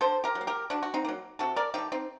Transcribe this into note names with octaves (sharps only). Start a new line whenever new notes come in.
D3 A4 C5
G4 A#4
F#3
A#3
G4 A#4
D3 D4 F#4
F#4
C4 D#4
F#3 A#3
C3 F#4 A4
A#4 D5
D#3 A3 D#4 G4
C4 D#4